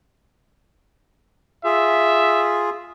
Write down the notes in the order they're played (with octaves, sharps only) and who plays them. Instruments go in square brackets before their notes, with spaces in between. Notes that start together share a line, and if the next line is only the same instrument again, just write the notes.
[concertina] F4 G#4 [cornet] E5